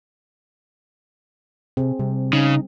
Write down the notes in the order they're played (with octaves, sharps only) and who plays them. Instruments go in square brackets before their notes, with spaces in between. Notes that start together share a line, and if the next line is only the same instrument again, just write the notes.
[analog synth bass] C3 [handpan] C4 G#4
[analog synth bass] C3 [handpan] G3
[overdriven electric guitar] C#3 [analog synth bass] D#4